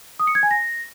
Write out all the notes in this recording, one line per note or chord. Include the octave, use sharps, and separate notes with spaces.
D#6
C#7
G#6
G#5
A#6